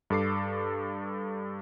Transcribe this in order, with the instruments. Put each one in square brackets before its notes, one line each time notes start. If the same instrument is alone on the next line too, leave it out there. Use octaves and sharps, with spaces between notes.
[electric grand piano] G2 A4 D6 C7